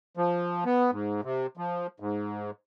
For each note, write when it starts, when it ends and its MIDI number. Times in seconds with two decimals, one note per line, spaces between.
0.17 0.64 53
0.65 0.91 59
0.91 1.21 44
1.24 1.47 48
1.57 1.87 53
2.00 2.51 44